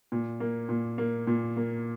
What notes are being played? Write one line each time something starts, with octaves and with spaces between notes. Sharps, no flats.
A#2
A#3
A#2
A#3
A#2
A#3